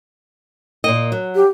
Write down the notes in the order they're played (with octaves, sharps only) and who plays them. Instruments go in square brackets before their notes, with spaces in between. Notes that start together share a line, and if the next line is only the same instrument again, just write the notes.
[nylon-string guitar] A#2 A#3 D#5
F#3
[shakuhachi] G4